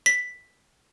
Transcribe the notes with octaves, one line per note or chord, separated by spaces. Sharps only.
B6